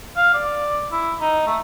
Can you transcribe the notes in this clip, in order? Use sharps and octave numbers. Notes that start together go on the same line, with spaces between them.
F5
D5
E4
D#4
A3